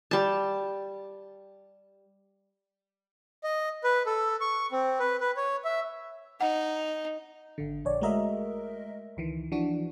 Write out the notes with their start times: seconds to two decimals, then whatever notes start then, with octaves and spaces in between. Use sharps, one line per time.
0.11 G3 A5
3.44 D#5
3.84 B4
4.06 A4
4.41 C#6
4.72 C4
4.99 B4
5.20 B4
5.37 C#5
5.64 E5
6.41 D#4 F#5
7.58 G#1 D3
7.85 A#1 C#5 D5
8.01 G#3 A3 F#4 A#4 D#5 E5
9.17 C#2 D#3 E3
9.52 E3 F3 D4 F#4